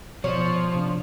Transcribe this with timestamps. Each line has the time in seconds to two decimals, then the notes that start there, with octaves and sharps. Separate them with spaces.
0.24 B2 F3 C#5
0.73 C3 D4